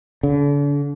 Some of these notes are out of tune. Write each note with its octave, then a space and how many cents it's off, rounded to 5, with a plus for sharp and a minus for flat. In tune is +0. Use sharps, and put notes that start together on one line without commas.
D3 -40